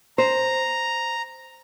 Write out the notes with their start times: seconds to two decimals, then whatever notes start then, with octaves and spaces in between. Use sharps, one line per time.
0.18 C5 A#5